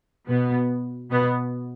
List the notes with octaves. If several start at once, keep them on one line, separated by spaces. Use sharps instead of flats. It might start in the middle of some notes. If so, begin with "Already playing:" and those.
B2 B3
B2 B3